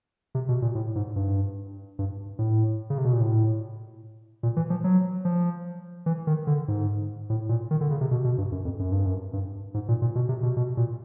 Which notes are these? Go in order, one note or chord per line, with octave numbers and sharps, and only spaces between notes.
C3
B2
A#2
A2
G#2
G2
G2
A2
C#3
C3
B2
A#2
A2
A#2
E3
F3
F#3
F3
E3
D#3
D3
G#2
A2
A#2
D#3
D3
C#3
C3
B2
B2
G2
F#2
F2
F#2
G2
F#2
G2
G#2
A#2
A#2
B2
C3
B2
B2
A#2